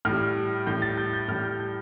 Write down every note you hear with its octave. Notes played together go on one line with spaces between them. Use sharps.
A2 G3 F6
A2 G3 G6
A6
G6
G6
A2 G3 F6
G6
G6